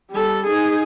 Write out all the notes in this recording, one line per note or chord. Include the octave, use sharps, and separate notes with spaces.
G3 A4
D#4 G#4